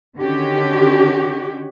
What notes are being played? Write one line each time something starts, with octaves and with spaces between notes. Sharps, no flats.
D3 D#3 C#4 F#4 G4